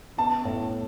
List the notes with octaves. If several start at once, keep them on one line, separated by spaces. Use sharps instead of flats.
B3 A5
A2